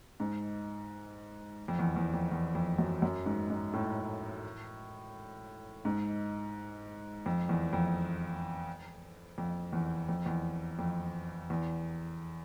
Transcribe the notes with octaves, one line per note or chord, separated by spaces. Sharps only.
G#2
F2
E2
E2
F2
E2
F2
F#2
F#2
G#2
G#2
A2
G#2
F2
E2
F2
F2
E2
F2
E2
F2
E2